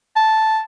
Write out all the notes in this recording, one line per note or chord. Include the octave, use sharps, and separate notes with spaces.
A5